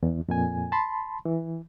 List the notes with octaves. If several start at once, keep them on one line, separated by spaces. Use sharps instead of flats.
E2
F2 A#2 G#5
A5 B5 C6
E3